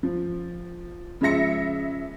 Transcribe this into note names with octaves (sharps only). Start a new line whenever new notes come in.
F3
C#3 F3 G#3 E5 A#6 C#7